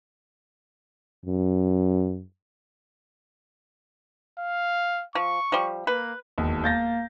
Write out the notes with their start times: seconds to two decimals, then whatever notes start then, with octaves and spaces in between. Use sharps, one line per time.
1.26 F#2
4.39 F5
5.15 F3 C#6
5.52 F3 G3
5.87 A#3 B4
6.38 E1 D#2
6.64 A#3 G6 A6 A#6